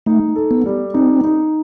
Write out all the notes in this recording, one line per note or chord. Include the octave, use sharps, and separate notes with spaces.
A3 D#4
A4
B3
G3
C4 D#4
D#4